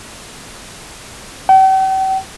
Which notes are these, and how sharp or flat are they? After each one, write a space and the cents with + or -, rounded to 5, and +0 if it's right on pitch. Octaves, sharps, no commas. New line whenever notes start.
G5 -45